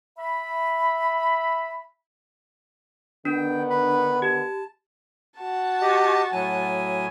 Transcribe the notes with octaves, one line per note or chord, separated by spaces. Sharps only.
E5 B5
D3 D#3 B3 D4 G5
B4 B5
G4 A5
F#4 A5
G4 D#5
A2 F#3 G#5